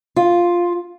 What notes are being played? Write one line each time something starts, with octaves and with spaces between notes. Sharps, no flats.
F4